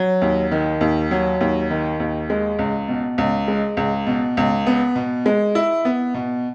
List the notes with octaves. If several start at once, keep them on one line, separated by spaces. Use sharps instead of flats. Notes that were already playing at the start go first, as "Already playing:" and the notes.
Already playing: F#3
D#2
D#3
D#2
F#3
D#2
D#3
D#2
G#3
C#2
B2
C#2
G#3
C#2
B2
C#2
B3
B2
G#3
E4
B3
B2